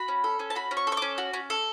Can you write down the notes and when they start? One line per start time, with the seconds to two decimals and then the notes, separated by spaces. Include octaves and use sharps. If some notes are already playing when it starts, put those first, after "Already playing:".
Already playing: F#4 B5
0.08 C#4
0.24 A4
0.39 C#4
0.50 A5
0.55 F#4 B5
0.71 C#4
0.77 C#6
0.87 A4
0.92 C#6
0.97 C#4 D6
1.18 F#4
1.33 C#4
1.50 A4